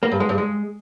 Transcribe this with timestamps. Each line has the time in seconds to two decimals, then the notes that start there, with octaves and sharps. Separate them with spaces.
0.03 A#3
0.11 G2
0.20 G#3
0.29 G2
0.38 G#3